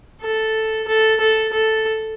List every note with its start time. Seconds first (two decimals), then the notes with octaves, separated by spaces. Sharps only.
0.21 A4
0.88 A4
1.20 A4
1.53 A4